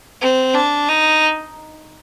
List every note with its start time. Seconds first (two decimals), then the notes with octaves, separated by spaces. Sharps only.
0.21 C4
0.54 D4
0.88 D#4